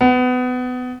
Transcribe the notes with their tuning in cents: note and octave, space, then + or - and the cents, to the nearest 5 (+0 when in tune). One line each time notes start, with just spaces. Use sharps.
B3 +25